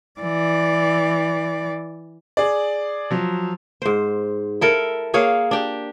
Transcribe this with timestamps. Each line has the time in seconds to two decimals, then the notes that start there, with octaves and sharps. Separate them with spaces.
0.21 E3 D5
2.37 G#4 D5
3.11 F3 F#3
3.82 G#2 C5
4.61 E4 A4 A#4
5.14 A#3 G#4 C#5 F5
5.51 D4 G4